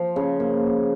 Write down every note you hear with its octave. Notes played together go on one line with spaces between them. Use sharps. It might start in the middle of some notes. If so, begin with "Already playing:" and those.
Already playing: F3
C#3
A#3